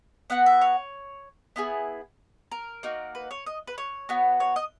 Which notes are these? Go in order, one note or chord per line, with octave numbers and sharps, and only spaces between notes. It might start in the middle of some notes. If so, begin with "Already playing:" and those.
B3 F#4 F#5
E5
C#5
B3 E4 G#4
A#4
A#3 D#4 F#4
B4
C#5
D#5
B4
C#5
B3 F#4
C#5
D#5